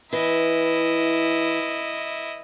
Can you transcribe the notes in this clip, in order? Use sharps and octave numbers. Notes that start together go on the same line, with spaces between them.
E3 E4 D#5